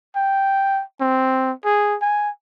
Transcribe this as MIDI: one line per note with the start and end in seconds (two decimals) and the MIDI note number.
0.16 0.82 79
1.01 1.52 60
1.65 1.96 68
2.02 2.30 80